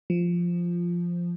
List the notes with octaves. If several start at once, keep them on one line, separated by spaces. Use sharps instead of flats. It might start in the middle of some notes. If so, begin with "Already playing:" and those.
F3